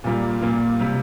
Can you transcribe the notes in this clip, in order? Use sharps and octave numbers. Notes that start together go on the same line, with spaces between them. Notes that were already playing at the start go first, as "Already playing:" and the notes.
A#2 G3 A#3 F4
A#2 G3 A#3 F4
C3 G3